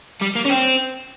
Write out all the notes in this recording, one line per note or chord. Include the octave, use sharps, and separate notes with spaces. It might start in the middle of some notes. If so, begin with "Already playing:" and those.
G3
A#3
C#4
C4